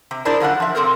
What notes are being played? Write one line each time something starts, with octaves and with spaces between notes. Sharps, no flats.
C3
D4 E4 G#4 A#4 C5 D5
F#2 D3 F4 F#4 F#5
F3 E5
C3 E3 C4 A4 A#4